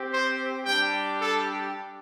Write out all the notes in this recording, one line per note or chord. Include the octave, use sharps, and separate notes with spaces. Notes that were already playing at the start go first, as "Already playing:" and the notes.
Already playing: C4 G4
C5
G3 D4 G4 G5
A4